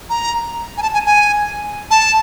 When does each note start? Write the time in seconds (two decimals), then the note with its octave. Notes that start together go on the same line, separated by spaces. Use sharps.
0.10 A#5
0.77 G#5
0.82 A5
0.94 G#5
1.06 G#5
1.91 A5